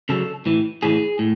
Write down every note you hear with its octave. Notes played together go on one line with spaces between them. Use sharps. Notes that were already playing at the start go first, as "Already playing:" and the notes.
C#3 F#3 A4
A2 E3
A2 E3 G#4
A2